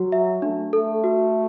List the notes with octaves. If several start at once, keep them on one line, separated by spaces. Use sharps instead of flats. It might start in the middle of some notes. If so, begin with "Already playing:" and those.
Already playing: F#3 F#4
E5
A3 D4
A3 A4
F#4